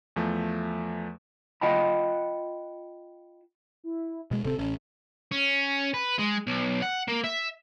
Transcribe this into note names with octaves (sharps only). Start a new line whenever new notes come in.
E2 F3 A3
F4 D#5 F#5 G5 A5 B5
E4
B2 G#3
D1 C3 C4 A4
A1 C#4
C#4
B4
G#3
B1
F#5
A#3
E5